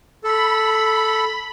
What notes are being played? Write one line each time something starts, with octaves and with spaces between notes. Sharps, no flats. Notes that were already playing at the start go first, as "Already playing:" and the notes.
A4 B5